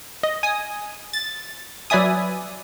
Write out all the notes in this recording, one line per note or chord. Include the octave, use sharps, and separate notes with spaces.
D#5
G#5 D#6
A6
F#3 B4 D5 E5 G#5 D#6